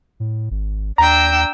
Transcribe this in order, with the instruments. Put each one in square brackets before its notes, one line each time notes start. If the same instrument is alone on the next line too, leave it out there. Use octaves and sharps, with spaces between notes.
[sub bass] A2
G#1
[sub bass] D#2 [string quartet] D4 G5 E6 [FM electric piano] A#5